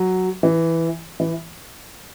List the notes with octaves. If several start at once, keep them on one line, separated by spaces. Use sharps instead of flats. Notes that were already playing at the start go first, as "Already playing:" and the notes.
Already playing: F#3
E3
E3